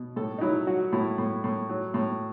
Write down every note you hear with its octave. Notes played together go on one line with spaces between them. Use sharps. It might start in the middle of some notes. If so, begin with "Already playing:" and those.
Already playing: B2
A2 A4
D#4
F#3 E4
F#3 F#4
A2 E4
A2
A2
F#3
A2